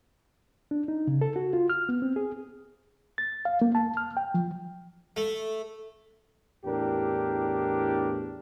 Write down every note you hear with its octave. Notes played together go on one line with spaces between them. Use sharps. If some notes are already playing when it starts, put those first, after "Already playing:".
D4
D#4
C#3
A4
F#4
F4
F6
B3
C4
G#4
A6
F5
A#3
A5
F6
G5
F3
A3
E2 A2 D4 G4 A#4